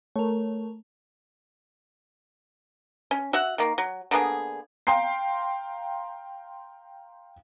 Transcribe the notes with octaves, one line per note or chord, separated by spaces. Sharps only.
A3 A#4 C#5
C#4
F#4 E5 F#5
D#3 A#3
F#3
D3 A#3 B3 G#4
F5 G5 A#5 C6 C7